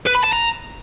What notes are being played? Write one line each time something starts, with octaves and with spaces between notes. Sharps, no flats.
B4
B5
A5
A#5